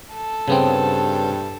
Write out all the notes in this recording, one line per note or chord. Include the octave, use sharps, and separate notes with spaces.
A4
G2 C#3 B3 C4